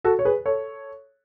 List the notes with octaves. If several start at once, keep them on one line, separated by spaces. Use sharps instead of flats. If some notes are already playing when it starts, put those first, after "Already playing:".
F#4 A4
C#5
G#4 B4
A4 C#5